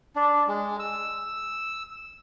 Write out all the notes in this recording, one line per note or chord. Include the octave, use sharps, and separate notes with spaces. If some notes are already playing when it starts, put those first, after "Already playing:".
D4
G#3
E6